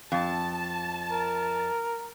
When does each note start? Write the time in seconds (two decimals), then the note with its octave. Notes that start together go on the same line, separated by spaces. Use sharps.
0.12 F2 A5
1.11 A#4